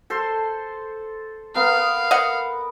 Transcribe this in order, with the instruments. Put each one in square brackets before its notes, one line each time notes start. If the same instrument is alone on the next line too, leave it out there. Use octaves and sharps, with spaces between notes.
[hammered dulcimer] A4 C5 C6
[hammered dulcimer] B3 A#4 [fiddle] F5
[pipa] D#5 F#5